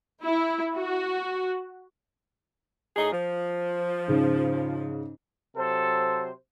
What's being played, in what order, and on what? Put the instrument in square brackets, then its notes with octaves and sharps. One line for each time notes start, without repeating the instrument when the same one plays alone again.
[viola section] E4
F#4
[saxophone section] A2 D#4 G#4
F3
[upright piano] G#2 C#3
[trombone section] C3 F#3 C5 [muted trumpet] A4